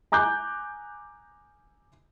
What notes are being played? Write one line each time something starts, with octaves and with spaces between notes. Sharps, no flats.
G#5 A#5 D6 F#6 G6